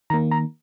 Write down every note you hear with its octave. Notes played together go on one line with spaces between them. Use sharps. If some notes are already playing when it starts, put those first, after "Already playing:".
D#3 A#3 A#5
A#5